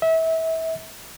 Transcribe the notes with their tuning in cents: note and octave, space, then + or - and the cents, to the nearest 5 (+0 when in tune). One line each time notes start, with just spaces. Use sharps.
E5 -30